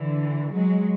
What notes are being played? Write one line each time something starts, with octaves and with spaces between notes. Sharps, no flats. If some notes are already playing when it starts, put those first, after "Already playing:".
Already playing: D3 E3
F#3 G#3